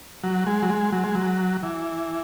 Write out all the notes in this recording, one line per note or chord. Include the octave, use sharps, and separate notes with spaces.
F#3
G#3
F#3
G#3
F#3
G#3
F#3
E3